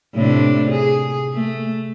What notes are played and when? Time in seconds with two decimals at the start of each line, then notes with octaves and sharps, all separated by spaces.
0.15 A2 C3 D4
0.70 G#4
1.34 A3